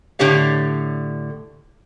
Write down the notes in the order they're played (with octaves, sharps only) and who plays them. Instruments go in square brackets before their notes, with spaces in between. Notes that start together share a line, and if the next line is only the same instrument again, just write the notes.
[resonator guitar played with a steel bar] A2 D3 G4 C#5 F5